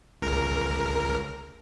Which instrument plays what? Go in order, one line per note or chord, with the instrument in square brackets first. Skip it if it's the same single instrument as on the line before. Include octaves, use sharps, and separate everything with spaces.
[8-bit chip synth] C#2 A#4